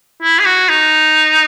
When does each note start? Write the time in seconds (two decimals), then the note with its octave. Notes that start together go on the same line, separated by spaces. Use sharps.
0.23 E4
0.39 G#4
0.46 F#4
0.69 D#4